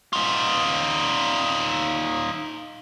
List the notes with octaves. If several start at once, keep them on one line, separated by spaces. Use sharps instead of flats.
D#4 F4